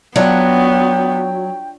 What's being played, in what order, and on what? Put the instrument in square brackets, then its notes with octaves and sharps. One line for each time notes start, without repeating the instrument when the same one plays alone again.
[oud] F#3 [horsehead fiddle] B3 [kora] D4 F4 F#5 [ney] G5